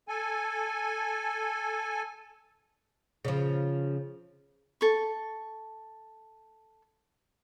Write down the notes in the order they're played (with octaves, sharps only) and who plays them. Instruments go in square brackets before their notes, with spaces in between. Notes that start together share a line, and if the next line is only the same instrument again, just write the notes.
[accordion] A4 G#5
[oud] C#3 F3
[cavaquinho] A4 C#6